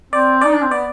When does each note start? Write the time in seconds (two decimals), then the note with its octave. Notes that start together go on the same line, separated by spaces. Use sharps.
0.13 C4 D5
0.41 D#4 D5
0.54 D4
0.62 C4
0.71 B3 D5